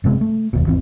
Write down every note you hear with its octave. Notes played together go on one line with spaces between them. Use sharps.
F#1 C3 G#3 B3
A3
F#1 D#2 B2
G#1 E2 E3 C4